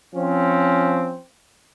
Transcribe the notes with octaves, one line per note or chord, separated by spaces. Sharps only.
F3 C4 C#4